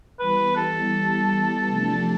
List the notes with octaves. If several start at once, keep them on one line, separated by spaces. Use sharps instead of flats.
E3 G3 B3 E4 G4 B4
A4
C3 F3 A3 D4 G4